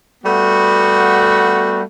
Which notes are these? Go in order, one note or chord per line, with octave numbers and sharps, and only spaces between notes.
G3 A3 B3 F#4